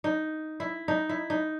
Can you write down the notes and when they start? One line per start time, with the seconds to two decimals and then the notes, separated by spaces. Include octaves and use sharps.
0.04 D#4
0.60 E4
0.88 D#4
1.09 E4
1.30 D#4